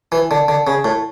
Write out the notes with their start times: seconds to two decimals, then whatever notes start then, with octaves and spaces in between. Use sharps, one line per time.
0.12 E3
0.31 D3
0.48 D3
0.67 C#3
0.85 A2